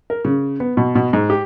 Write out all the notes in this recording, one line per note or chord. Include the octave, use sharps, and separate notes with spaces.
A#4
C#3
B3
B2
B2
G#2
G4